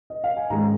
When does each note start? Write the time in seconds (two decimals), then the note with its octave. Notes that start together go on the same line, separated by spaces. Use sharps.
0.10 D#5
0.24 F5
0.37 G#5
0.50 G#2 D#3 G#3 C#4 A#5